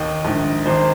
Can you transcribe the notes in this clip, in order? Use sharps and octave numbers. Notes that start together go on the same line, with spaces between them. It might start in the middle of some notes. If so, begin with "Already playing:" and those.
Already playing: D#2 D#3 D#5
A#1 G#2 D#3
G#1 D#3 C5